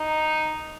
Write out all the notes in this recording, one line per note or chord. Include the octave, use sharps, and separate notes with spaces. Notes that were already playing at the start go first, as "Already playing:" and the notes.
Already playing: D#4